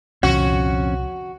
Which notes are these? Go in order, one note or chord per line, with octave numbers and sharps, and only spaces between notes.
C2 F2 A#2 D3 C#4 F#4